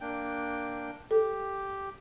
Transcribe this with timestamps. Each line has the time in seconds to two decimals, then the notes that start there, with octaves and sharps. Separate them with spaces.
0.01 A#3 D4 G5
1.11 G4 A4